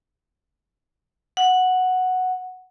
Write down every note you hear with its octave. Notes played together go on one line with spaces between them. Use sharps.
F#5